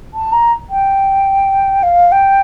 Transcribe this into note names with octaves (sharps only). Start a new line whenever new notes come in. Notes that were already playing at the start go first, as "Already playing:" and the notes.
A5
A#5
G5
F5
G5